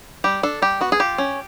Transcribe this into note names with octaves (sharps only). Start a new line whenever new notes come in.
G3 G4
D4 A4
G3 G4
B3 F#4
G#4
F4 G4
C#4